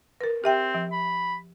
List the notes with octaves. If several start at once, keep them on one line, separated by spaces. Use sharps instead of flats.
A#4 B4
C4 G4 E5 G5
F3
B5